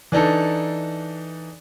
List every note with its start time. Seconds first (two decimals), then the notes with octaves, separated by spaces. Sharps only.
0.12 E3 D4 D#4 A4